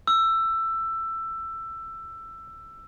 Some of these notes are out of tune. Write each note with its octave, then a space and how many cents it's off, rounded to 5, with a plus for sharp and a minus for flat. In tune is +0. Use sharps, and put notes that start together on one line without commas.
E6 +15